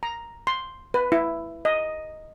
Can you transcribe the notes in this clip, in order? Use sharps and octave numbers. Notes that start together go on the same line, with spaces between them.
A#5
C6
B4
E4
D#5